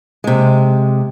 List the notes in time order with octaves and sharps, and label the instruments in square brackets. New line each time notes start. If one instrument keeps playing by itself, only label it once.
[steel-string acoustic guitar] C3 G#3